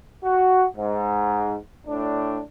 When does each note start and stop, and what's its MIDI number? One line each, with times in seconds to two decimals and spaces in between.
0.24 0.65 66
0.78 1.56 44
1.87 2.41 45
1.87 2.41 62